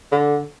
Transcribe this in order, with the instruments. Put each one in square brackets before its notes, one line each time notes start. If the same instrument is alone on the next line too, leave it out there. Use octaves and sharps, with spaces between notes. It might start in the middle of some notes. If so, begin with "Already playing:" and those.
[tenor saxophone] D3